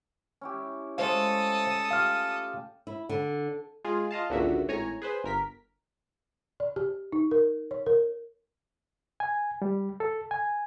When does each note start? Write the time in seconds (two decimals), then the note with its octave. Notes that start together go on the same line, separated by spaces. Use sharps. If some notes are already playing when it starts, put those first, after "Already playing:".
0.41 C#4 E4 G4
0.98 G#3 A3 A4 C5 F5 D#6
1.91 F4 G4 F5 F6
2.87 E4
3.09 D3
3.84 G#3 F4 G#4
4.11 F4 D#5 F5 A5
4.29 G#1 C#2 A#2 D3 F#4 E5
4.68 G#1 A2 C#5 G#5 A#5
5.02 G#4 B4 C5
5.24 G1 A#4 B6
6.60 D5
6.76 G4
7.12 D#4
7.31 A#4
7.71 C#5
7.86 A#4
9.20 G#5
9.62 G3
10.00 A4
10.31 G#5